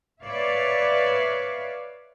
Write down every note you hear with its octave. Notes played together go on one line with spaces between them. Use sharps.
B4 C#5 D5 E5 F5